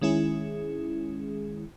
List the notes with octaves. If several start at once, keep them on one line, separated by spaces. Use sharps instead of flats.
D#3 G#3 C#4 E4 G#4